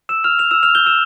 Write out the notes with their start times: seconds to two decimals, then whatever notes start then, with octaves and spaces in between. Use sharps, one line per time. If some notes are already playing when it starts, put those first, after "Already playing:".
0.09 E6 E7
0.24 F6 F7
0.39 F6 F7
0.51 E6 E7
0.63 F6 F7
0.75 G6 G7
0.86 E6 E7